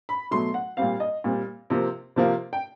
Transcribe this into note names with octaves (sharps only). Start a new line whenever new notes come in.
B5
B2 F#3 A3 C6
F#5
A#2 G3 C4 F5
D#5
A#2 G3 C4
C3 F3 A#3
C3 F3 A#3
G5